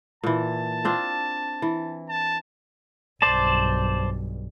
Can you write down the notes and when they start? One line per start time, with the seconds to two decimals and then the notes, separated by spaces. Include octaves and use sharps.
0.24 A#2 E3 A5
0.85 C4 D4 F4
1.62 E3
2.09 A5
3.22 B1 G2 C5 D5 A5